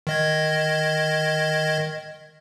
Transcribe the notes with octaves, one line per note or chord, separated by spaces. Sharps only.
D#3 D#5 G#6